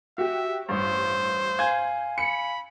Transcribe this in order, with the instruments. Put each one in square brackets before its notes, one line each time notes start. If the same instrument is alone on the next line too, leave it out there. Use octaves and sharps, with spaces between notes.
[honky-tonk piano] F#4 G4 [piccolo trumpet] E5
[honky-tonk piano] A1 G2 [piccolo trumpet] C5
[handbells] F5 G#5 [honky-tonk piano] G#6
[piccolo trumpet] B5 [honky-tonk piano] C#7